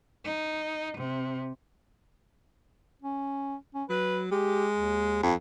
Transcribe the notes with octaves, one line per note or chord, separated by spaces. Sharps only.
D#4
C3
C#4
C#4
F#3 B4
G#3 G4
D#2
F2